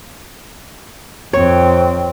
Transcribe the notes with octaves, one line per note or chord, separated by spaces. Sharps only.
F2 C4 C#5